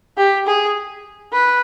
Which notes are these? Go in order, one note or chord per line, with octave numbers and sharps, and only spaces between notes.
G4
G#4
B4